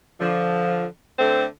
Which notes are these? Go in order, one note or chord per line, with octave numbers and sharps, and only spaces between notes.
D3 F3
D3 A3 C4 C5